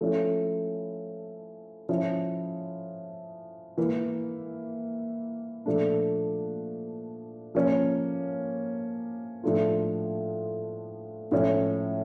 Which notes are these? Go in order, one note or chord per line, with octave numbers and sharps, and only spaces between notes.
F3 A3 C#4 E4
F3 C#4 E4
E3 A#3 E4
A#2 F3 A3 D4
F3 A#3 C#4
A2 F3 A3 D4 F4
A2 F3 C#4